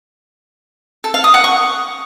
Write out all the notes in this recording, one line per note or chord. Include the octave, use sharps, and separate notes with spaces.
A4
F5
D#6
F#5
C#6